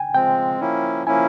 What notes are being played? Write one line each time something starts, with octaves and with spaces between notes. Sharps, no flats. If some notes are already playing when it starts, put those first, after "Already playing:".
Already playing: G5 G#5
F3 G#3 C4 G5
F3 A#3 C#4 E4
F3 A#3 C#4 E4 G#5